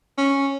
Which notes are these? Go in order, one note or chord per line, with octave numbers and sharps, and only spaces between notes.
C#4